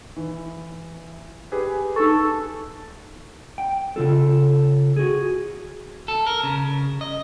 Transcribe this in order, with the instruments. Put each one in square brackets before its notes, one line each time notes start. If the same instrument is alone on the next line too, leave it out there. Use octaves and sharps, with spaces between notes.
[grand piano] E3
G4 G#4 B4
[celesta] D#4 C#6 [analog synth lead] A4
[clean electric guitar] G5
C#3 F4 A4
F#4 G#4
A4
A#4
C#3
D#5